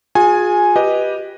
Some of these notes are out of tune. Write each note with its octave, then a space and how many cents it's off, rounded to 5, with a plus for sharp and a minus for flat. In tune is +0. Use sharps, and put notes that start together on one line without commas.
F4 +40 G#4 +0 G#5 +0
G4 +0 B4 -10 D#5 +0